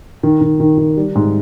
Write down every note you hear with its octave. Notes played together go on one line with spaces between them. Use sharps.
D#3
D#3
D#3
D#3
G3
G#2